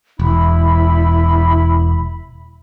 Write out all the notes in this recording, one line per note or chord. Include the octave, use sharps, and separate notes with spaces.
E1 E4 B5